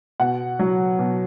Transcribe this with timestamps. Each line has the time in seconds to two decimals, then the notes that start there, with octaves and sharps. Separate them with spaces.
0.20 B2 F#5
0.59 F#3
0.99 B2